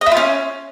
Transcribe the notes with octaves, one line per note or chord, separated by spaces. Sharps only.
D#5
E4
F4
C#4